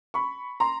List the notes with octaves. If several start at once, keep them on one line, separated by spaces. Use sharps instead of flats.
B5 C#6
A#5 C6